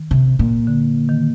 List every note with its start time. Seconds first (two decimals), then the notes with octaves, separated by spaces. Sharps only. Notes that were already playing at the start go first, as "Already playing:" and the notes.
Already playing: D#3
0.11 C3
0.39 A#2
0.67 D3
1.09 D#3